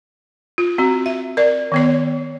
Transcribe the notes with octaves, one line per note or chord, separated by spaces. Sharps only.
F4
C4 F#4
E5
A#4 D5
D#3 B3 C#5